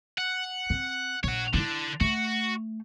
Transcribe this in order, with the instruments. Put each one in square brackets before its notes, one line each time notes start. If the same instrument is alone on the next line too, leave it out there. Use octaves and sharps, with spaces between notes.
[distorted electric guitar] F#5
[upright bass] C4
[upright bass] A#1 [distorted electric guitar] C#5 F#5
[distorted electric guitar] D3 D4 [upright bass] E4 F4
[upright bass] A3 [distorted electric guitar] F#4